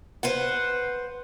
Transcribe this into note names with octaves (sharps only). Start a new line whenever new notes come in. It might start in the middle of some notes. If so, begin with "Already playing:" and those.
B4 C5 F#5